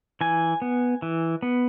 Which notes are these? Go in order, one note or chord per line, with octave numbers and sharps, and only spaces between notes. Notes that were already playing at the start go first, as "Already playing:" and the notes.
E3 G#5
B3
E3
B3